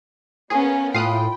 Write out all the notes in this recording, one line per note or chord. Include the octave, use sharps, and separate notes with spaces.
A#3 B3 C#4 G#4 A#4 G#5 D#6
A2 F4 F5 G5 A5 B5 D#6 F#6